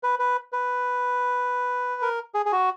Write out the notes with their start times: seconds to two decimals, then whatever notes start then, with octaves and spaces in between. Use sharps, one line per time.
0.03 B4
0.19 B4
0.53 B4
2.02 A#4
2.35 G#4
2.46 G#4
2.52 F#4